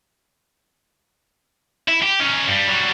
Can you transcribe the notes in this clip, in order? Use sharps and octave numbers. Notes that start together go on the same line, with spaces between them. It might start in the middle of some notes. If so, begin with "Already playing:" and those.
E4
G4
C#4 D#4
G2 G3
F#3 G3